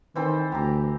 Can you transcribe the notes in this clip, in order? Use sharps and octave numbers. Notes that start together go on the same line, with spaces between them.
D#3 E3 C4 A4
D2 G4 A#5